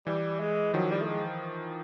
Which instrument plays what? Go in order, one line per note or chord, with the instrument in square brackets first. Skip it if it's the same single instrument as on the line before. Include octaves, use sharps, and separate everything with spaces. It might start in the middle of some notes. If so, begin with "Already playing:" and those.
[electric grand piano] E3 [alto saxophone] G3
[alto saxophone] G#3
[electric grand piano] D#3 F3 [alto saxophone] F#3
[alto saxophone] G3
A3
G#3